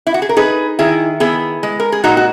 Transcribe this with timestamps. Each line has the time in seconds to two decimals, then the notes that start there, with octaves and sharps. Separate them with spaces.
0.07 E4
0.14 F#4
0.22 G#4
0.29 A#4
0.37 D#4 G#4 B4
0.79 D#3 E4 G#4
1.20 B3 E4 G#4
1.63 G#3
1.80 A#4
1.92 G#4
2.04 A#2 D#4 F#4
2.17 F#4